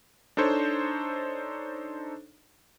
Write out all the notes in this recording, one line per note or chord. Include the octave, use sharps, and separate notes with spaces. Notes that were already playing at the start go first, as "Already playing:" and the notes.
D4 D#4 A4 C5 C#5